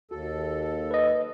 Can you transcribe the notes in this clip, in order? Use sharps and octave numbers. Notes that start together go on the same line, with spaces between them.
D#2 F#4 A4
B4 D#5